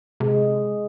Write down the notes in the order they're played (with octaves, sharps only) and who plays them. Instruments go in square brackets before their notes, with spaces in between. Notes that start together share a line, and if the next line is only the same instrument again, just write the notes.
[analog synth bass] C3 [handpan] G#3